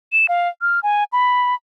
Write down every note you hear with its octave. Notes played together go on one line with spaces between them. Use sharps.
E7
F5
F6
G#5
B5